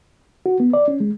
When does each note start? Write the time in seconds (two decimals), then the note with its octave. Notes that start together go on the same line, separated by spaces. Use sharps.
0.46 F#4
0.60 B3
0.74 D5
0.88 C#4
1.00 G#3